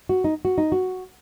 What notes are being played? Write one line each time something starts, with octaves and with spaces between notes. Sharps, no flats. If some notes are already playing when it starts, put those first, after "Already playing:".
F#4
D#4
F#4
D#4
F#4